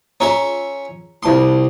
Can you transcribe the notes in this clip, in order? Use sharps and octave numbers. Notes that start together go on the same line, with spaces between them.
C#4 F4 G#4 E5 A#5 C6
C2 F4 A5 C6 D#6